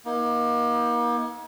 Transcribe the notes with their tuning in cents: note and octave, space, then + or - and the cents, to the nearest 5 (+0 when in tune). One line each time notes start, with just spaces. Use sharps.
A#3 +35 D#4 +35